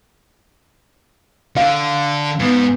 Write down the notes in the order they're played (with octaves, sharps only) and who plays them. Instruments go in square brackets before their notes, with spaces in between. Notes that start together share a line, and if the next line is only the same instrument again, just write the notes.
[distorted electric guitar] D3 [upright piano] F5
[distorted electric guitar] G#2 [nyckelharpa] B3